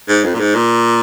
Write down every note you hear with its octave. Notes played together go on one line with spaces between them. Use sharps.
G#2
F2
A#2
G#2
A#2